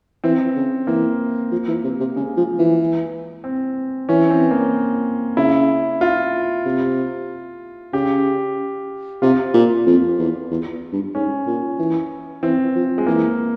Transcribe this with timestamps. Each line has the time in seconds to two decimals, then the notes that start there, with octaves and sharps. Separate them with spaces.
0.23 E3 C4
0.55 C#3
0.87 E3 A#3
1.52 F3
1.68 E3
1.84 C3
2.00 C3
2.16 C#3 G#3
2.37 F3
2.59 E3
3.44 C4
4.09 E3 C#4
4.30 C4
4.51 A#3
5.37 C#3 E4
6.01 F4
6.65 C3
7.93 C#3 G4
9.22 C3 F4
9.54 A#2
9.86 F2
10.19 E2
10.51 E2
10.93 G2
11.15 G#2 C#4
11.46 A#2
11.79 E3
12.42 E3 C4
12.75 F3
12.98 G#3
13.07 E3 A#3